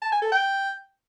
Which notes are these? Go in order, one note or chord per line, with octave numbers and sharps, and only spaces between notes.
A5
G#5
A4
G5